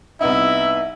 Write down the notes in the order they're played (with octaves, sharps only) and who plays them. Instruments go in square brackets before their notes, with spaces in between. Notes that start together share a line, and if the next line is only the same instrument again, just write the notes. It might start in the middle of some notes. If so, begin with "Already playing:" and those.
[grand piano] C2 B3 D#4 [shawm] E4 [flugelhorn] E5